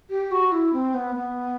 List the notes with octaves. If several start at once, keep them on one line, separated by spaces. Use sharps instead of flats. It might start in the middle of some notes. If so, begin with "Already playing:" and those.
G4
F#4
E4
C4
B3
B3